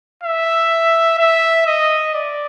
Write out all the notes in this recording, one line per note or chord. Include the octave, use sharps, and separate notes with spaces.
E5
E5
D#5
D5